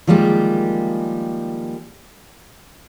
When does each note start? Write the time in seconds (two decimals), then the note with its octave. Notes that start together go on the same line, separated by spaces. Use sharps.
0.07 D#3 F3 G3 G#3 A#3 G4